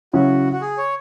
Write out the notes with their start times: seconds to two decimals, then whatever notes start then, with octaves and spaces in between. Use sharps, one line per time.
0.13 C#3 F#3 C#4 E4 F#4
0.52 F#4
0.61 G#4
0.78 C#5